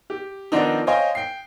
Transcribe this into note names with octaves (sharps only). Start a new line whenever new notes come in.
G4
D#3 F3 B3 C4 D4 D#4
C5 C#5 D#5 F5 G5 G#5
G5 C7